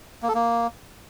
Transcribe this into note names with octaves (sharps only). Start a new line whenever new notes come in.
A#3
A4
A#3